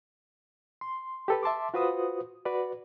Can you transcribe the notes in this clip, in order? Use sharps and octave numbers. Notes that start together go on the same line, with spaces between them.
C6
G4 A4 B4
E5 A5 C6 D6
F4 F#4 B4 C5 D#6
F#4 B4 D5